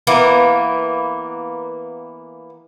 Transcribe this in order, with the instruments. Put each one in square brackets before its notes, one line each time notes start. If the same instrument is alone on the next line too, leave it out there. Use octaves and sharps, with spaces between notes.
[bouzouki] E3 A#3 B3